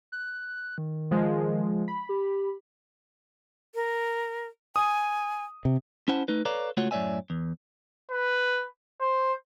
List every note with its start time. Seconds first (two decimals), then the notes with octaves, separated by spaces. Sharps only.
0.12 F#6
0.78 D#3
1.11 F3 G#3
1.88 B5
2.09 G4
3.75 A#4
4.76 G#5 D#6
5.65 C3
6.08 C#4 E4 C5 F#5 A5
6.28 A3 D#4 B4
6.45 A4 B4 C#5 D5 F5 A#5
6.77 C#2 A3 F4 F#4 C#5 F#5
6.91 F#2 A2 C#5 D5 E5 G#5
7.30 E2
8.11 B4
9.01 C5